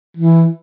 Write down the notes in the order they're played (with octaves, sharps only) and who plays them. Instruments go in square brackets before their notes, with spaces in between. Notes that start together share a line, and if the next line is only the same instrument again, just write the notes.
[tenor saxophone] E3